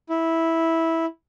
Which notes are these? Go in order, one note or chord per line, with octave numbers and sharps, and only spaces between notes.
E4